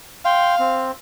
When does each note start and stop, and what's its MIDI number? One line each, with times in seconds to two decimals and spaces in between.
0.25 0.93 77
0.25 0.55 79
0.25 0.55 84
0.59 0.91 60